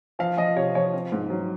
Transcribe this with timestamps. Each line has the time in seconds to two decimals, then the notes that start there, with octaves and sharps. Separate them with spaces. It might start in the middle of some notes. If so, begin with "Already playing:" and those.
0.19 F3 F5
0.37 F3 D#5
0.56 C3 C#5
0.75 F3 C#5
0.93 C4
1.12 G#2
1.30 F#3